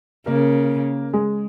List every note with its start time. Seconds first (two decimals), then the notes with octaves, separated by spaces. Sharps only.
0.26 C#3 A#3 A#4
1.13 G#3 G#4